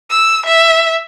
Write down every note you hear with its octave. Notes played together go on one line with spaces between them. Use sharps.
E6
E5